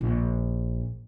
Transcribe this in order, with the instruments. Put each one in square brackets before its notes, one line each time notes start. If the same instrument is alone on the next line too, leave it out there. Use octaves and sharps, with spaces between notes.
[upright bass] A#1